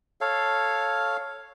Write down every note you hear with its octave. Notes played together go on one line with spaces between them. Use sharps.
A4 C#5 F5